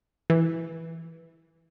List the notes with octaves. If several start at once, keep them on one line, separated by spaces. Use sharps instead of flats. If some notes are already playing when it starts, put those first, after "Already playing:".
E3